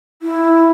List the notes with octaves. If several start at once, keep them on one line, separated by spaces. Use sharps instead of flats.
E4